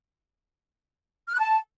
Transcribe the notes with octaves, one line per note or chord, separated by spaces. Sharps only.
F6
F#6
A5